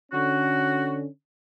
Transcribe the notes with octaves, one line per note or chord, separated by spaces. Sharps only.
D3 C#4 F#4